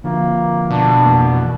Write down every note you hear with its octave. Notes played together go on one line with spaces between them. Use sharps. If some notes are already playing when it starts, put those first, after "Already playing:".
D3 F3 A#3
B2 D4
F2 E3 A#3